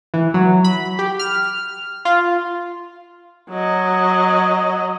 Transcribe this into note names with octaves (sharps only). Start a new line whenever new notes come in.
E3
F#3
B5
G4
F6
F4
F#3 D#5